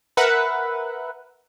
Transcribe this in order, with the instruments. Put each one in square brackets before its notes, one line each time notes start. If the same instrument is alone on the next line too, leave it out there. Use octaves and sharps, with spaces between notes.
[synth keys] A#4 B4 E5 F#5